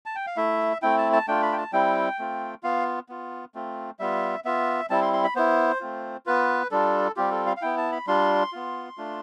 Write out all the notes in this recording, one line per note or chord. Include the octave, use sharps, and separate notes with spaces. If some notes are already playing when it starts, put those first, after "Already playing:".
A5
G5
F5
A3 E4 E5
A3 C4 E4 G5
A5
A5
A3 D4 F4 G5
B5
G5
A5
G3 C4 E4 G5
A3 C4 F4
B3 F4 F5
B3 F4
A3 C4 F4
G3 B3 F4 E5
B3 F4 E5
G3 C4 E4 A5
C6
C6
B5
B3 E4 C5
A3 C4 F4
B3 F4 B4
G3 D4 F4 A4
G3 C4 F4 G4
A4
F5
F5
B3 E4 G5
A5
B5
G3 D4 F4 C6
B3 F4
A3 D4 F4